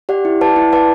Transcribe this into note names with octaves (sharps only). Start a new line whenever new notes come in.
G4 D5 F#5
E4
B4 D5 F#5 A5
E4
B4 D5 F#5 A5